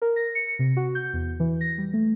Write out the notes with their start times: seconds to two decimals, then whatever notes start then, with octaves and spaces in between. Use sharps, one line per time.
0.02 A#4
0.16 A#6
0.35 C#7
0.59 C3
0.77 F#4
0.95 G6
1.13 E2
1.40 E3
1.61 A#6
1.78 G3
1.93 A3